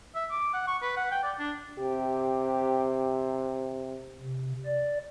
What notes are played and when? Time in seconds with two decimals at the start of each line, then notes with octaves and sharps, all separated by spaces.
0.15 E5
0.31 D6
0.53 F#5
0.67 C#6
0.82 B4
0.97 F#5
1.11 G5
1.23 D5
1.39 D4
1.79 C3 G4
4.20 C3
4.65 D5